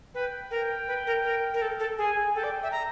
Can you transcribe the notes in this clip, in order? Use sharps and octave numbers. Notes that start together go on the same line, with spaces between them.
B4 G5
A#4 G5
B4
A#4
A#4
A#4
A4
A4
G#4 G#5
A4 G5
D5
E5
A#5